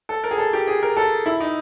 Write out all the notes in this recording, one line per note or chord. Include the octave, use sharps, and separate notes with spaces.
A4
A#4
G#4
A4
G4
G#4
A#4
A4
E4
D#4